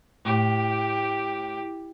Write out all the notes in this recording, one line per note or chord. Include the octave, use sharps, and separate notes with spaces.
A2 G4